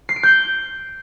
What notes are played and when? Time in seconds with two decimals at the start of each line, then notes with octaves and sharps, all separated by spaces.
0.09 C7
0.16 D7
0.23 G6